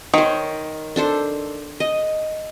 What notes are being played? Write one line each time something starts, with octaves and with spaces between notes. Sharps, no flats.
D#3 C5 C#5
D4 A4 C5
D#5